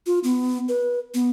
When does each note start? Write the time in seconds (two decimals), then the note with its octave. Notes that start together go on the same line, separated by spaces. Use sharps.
0.06 F4
0.24 B3
0.69 B4
1.14 B3